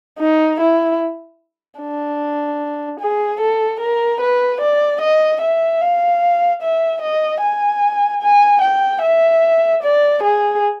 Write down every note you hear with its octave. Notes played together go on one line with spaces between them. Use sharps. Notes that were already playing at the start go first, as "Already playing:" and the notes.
D#4
E4
D4
G#4
A4
A#4
B4
D5
D#5
E5
F5
E5
D#5
G#5
G#5
G5
E5
D5
G#4